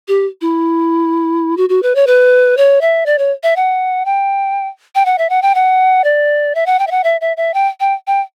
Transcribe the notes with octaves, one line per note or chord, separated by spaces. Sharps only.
G4
E4
F#4
F#4
B4
C#5
B4
C#5
E5
D5
C#5
E5
F#5
G5
G5
F#5
E5
F#5
G5
F#5
D5
E5
F#5
G5
E5
F#5
E5
E5
E5
G5
G5
G5